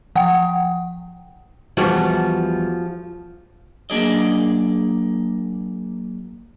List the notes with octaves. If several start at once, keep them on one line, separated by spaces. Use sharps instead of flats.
F3 F#5 G5
E2 F3 G3 F#4
F#3 A#3 D4 G#4 D5 D#5